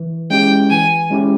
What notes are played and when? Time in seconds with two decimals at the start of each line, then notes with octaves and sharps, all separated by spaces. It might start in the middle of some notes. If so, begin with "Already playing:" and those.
Already playing: E3
0.30 G#3 C#4 E4 G4 G5
0.70 E3 G#5
1.10 G#3 C#4 E4 G4